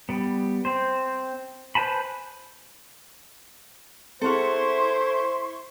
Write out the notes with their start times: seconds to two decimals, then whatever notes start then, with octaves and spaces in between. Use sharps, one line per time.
0.09 G3 B3
0.65 C4 C5
1.75 B4 C5 G#5 A5 B5
4.22 C4 E4 G#4 A4 C5 F#5 C6 C#6